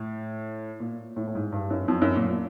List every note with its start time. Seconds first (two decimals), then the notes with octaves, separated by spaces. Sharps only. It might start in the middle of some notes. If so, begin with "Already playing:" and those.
Already playing: A2
0.80 A#2
1.16 A2
1.27 A2
1.35 G#2
1.52 G2
1.70 F#2
1.88 F2
2.02 F#2
2.16 A#2
2.29 A#2